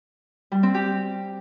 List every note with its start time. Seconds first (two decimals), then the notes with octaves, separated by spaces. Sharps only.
0.52 G3
0.63 C4
0.74 G4